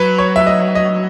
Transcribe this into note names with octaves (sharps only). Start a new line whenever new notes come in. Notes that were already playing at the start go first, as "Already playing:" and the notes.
Already playing: F#3 B4
C#5
E5
D#5
D#5